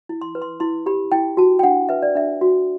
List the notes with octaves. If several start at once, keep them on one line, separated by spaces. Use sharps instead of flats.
E4
C6
B4
C6
E4 C6
G4 B5
E4 G5
F#4 A5
G5
D4 F#5
B4 E5
D5
D4 E5
F#4